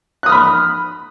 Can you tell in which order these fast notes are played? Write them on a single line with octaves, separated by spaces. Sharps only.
F#6 D#6 F6 B5